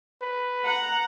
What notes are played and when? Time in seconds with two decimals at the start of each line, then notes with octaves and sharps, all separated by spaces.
0.22 B4
0.65 F#5 A#5